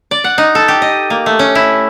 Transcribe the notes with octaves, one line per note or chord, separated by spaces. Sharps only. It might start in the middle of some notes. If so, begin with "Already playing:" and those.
D5
F#5
D#4
A4
G4
D#5
A#3
A3
C#4
E4